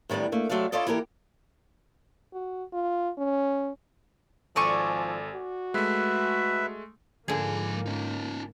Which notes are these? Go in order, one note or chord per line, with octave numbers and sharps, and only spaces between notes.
A2 D#3 G3 B3 D4
A3 A#3
C3 F#3 A3 A4 D5 F5
C#4 E4 F4 A4 D5 D#5
E3 A#3 E4 G4 A4 A#4
F#4
F4
C#4
G#1 F3 A4 D5 G#5 C#6
F#4
G#3 A3 B4 E5
G#2 D3 F3 A#3 G#4 G#5
C#4 D#4